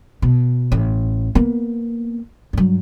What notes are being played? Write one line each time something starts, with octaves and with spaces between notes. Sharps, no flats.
B2
A1
A#3 B3
G2 F#3